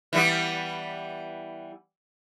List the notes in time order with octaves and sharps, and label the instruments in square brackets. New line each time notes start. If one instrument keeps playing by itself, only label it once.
[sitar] E3 G3 B3